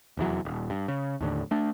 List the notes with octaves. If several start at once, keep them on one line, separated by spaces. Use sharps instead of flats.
F1 E2 E3 F#3
D#1
G2
C#3
D#2 A2 D3
A3 D4